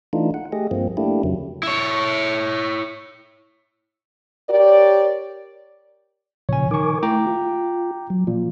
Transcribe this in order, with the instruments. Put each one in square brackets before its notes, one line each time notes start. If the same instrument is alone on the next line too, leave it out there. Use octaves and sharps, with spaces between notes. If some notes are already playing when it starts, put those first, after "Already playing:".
[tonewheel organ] E3 A3 D4 D#4 F4
F#5
A3 G4 G#4 D#5
G2 F3 A#3 C4
A3 A#3 D4 E4 G4
F2 C#3 F#3
[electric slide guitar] E4 C#5
[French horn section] G4 A#4 C#5 D5
[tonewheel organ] A#2 C#3 F3 [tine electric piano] C#5 G#5
[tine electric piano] D#3 C#6 [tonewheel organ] A#4 G#5 D6
[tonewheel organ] A3 E4 [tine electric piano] G5 A#5 D6
[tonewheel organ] F4
F#3
[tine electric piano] A#2 [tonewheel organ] F3